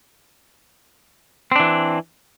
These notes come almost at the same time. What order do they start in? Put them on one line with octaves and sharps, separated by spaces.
C4 D4 E3